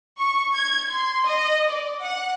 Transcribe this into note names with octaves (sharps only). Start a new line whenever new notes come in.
C#6
G#6
C6
D#5
D5
F#5